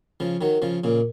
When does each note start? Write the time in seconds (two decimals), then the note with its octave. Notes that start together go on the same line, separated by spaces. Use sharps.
0.20 C#3 F3
0.41 D#3 F#3
0.62 C#3 F3
0.84 A#2 C#3